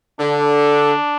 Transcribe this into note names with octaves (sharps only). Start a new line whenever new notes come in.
D3 D4